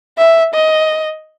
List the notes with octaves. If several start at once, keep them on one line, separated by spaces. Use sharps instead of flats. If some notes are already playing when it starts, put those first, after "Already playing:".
E5
D#5